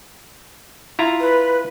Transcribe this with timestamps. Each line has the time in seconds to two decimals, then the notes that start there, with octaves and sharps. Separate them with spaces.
0.99 E4 F4 A#5
1.20 B4